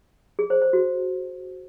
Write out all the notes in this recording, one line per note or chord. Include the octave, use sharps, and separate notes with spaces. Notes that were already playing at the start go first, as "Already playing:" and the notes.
G#4
C5
C5
F#4